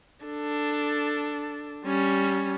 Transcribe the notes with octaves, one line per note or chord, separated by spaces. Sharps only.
D4 A4
G3 C#4